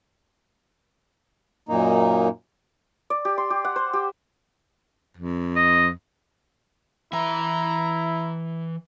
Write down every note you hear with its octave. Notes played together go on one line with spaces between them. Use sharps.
F#2 A#2 A#3 D#4
D5
G4
C6
G4
F#5
C5
G4
F2
D#5
E3 E4 E5 A#5